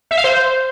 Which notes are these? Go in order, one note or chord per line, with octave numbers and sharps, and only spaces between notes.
E5
F5
C5